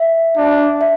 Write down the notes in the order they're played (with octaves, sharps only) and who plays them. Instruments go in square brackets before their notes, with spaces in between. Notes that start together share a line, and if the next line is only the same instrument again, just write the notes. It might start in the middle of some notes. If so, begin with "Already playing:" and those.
Already playing: [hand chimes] E5
[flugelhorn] D4
[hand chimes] E5